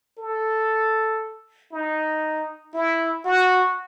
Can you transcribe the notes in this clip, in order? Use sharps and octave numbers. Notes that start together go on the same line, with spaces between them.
A4
D#4
E4
F#4